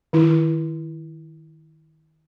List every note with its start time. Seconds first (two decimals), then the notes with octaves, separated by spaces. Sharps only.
0.13 D#3 E4